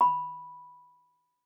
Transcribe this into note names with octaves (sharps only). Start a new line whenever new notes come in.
B5